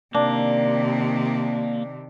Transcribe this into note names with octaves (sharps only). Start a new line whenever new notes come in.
C3 D#3 A#3 D4